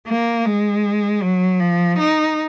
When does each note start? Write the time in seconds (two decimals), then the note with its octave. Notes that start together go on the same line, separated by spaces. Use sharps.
0.08 A#3
0.46 G#3
1.22 F#3
1.61 F3
1.99 D#4